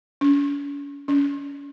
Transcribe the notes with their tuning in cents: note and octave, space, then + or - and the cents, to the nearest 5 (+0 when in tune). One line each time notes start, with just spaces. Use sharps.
C#4 +40
C#4 +35